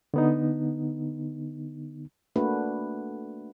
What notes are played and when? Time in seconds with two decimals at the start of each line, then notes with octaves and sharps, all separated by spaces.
0.14 D3 B3 D#4
2.36 A3 A#3 D4 F#4 B4